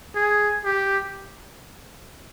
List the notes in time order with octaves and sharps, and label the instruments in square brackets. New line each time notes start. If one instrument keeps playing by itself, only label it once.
[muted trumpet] G#4
G4